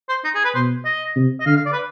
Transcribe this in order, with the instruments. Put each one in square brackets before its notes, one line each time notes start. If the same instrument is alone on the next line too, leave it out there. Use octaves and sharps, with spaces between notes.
[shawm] C5
D#4
G#4
B4
[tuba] B2 [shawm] C5
[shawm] D#5
[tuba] C3
[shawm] D#5
[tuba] D3 [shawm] F5
[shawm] F5
D5
B4